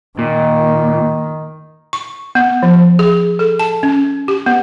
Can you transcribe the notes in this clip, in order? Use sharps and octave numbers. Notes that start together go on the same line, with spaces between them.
A#2 D#3
C#6
B3
F3
G#4
A4
A5
C#4
G4
B3